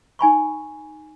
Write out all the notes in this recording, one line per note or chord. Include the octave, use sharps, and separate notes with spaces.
D#4 G#5 B5 C#6